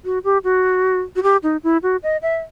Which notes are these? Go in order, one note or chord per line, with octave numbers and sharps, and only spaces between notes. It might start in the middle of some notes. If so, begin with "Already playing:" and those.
F#4
G4
F#4
F#4
G4
D#4
E4
F#4
D#5
E5